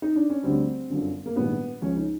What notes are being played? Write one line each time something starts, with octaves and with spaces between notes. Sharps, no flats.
D#4
D4
C#4
D2 D3 G3 C4
G1 F#2 D3
A#3
A#1 G#2 D#3 G3 B3
C#2 C#3 F3 C#4
D#4